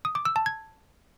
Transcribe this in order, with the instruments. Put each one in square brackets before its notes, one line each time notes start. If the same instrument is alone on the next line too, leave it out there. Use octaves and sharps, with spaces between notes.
[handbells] D#6
D6
E6
A5
G#6